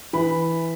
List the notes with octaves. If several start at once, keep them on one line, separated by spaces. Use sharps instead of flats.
E3 B5